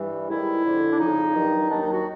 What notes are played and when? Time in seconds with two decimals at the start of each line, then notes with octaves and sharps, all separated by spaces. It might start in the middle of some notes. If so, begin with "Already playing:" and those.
Already playing: G2 E3 G3
0.28 G#2 D#3 G3 E4
0.64 F2 D3 F3
0.91 D4
0.99 F2 C#3 F3 D#4
1.34 G2 D#3 F#3
1.70 D#2 D#3 F#3 D4
1.82 D#4
1.93 F#4